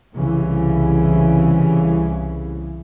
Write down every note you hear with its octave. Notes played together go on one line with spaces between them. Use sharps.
C2 C#3 E3